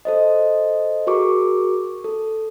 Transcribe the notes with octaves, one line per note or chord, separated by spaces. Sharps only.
A4 C5 D#5
F#4 G#4 A#4 C#6 D6
A4